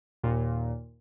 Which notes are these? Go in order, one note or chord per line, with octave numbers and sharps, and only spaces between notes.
D#2 A#2